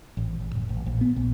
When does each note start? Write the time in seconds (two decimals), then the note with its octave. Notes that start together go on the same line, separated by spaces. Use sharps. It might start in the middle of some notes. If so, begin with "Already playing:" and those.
0.17 A1
0.41 A1
0.55 F#1
0.69 A1
0.86 A#1
1.01 B3
1.16 A#1